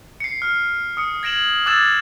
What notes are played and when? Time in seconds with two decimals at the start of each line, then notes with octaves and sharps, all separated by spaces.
0.20 C7 C#7
0.42 F6 C7
0.97 D#6 C#7
1.23 G#6 A#6 D7 E7 F#7
1.66 D6 E6 F#6 G#6 A6 E7